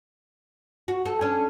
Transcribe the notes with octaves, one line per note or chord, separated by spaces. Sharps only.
F#4
A4
C#4 D4